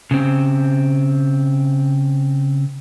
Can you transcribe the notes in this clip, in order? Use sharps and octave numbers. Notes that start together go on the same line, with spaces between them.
C#3 C4